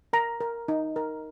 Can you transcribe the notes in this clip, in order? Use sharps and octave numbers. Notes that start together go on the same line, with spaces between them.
A#4 A#5
A#4
D#4
A#4